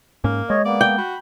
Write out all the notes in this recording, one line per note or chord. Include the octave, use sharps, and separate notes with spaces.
G#2 A#3 C#4
G#3 C#5 D#5
A#3 B3 D5
G5
F#4 B5